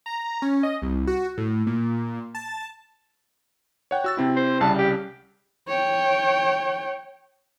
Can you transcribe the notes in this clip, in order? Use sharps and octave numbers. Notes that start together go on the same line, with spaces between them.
A#5
C#4
D#5
C2
F#4
A2
A#2
A5
C#5 F#5 G5
F#4 E6 A6
C3 C4 E4
C5
C2 C#3 G3 A5
G4
C#5 G5